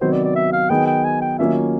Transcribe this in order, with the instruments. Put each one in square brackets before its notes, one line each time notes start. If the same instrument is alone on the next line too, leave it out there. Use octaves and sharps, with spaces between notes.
[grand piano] C3 D#3 F#3 B3 [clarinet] C5
[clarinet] D5
D5
E5
F5
[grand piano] D#3 F#3 B3 D#4 G#4 [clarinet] G5
[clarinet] G5
G#5
G5
[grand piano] D#3 F#3 A#3 C#4 F4 [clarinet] E5